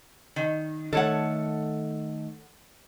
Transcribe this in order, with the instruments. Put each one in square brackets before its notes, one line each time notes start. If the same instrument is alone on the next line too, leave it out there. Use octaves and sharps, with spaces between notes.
[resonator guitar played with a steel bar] D#3
[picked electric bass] D#3 A3 [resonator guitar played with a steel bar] A4 C#5 F#5